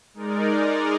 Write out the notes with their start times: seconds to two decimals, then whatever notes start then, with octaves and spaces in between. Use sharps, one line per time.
0.14 G#3 D#4 A#4 D5